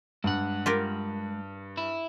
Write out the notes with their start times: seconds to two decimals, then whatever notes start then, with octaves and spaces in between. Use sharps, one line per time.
0.24 G2 G#3 F#5
0.66 F4 G4 A#4
1.78 E4